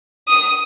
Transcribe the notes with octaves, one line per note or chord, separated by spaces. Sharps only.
D#6